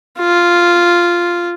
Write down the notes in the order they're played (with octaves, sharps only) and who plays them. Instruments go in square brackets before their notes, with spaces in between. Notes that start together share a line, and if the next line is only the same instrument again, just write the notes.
[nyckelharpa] F4